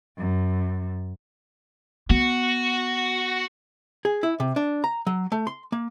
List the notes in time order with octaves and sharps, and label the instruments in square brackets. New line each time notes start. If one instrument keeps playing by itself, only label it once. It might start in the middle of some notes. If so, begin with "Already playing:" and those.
[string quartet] F#2
[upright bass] B3 [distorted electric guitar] F#4
[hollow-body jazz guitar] G#4
E4
C3
D4
A#5
F#3
A3
C6
A#3